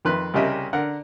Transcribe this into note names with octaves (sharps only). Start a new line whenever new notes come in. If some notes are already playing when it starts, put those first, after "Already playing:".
F2 D#3 B4 C6 F#6
C2 C#3 G4 A#4 D#5 E5
D3 A#4 F#5